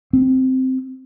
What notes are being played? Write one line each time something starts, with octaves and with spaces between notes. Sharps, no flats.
C4